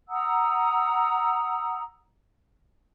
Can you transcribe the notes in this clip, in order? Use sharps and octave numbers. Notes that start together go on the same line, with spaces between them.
F#5 A#5 D#6 E6